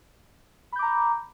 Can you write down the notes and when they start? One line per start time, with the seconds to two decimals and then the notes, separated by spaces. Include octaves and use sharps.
0.72 B5
0.76 G6
0.79 D6
0.82 A#5